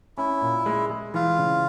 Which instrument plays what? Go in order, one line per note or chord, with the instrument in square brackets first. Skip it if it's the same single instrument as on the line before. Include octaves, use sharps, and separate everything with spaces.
[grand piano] C#4 [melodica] E4
[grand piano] A#2
G#3
G#3
[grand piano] E3 [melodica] F4
[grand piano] C#3